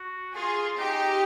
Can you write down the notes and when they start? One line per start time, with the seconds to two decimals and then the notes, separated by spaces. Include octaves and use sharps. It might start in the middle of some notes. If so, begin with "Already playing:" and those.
Already playing: F#4
0.36 F4 G#4
0.78 D#4 G4